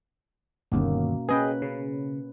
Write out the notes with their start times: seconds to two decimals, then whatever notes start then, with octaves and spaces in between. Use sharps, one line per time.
0.72 G1 D#2 B2 A#3 C#4
1.29 C#4 G#4 B4 D#5 G5
1.62 C#3